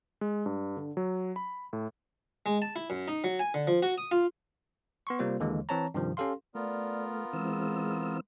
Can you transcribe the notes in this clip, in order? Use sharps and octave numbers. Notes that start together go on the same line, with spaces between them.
G#3
G2
D3
F#3
B5
A2
G#3
A5
E4
F#2
D#4
F#3
G#5
D3
F3
F#4
D#6
F4
B3 C6 C#6
C3 G3 A#3 F4 C5
D#2 D3 E3 G#3
E3 C4 C#5 A5 A#5
G2 C3 D#3 F3
C#4 G4 A4 F5 C6
A3 B3 F4 A#4 D5
E3 G#3 C4 E6